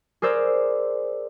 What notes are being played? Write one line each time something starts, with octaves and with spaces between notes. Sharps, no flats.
G#4 A#4 C5 D5 E6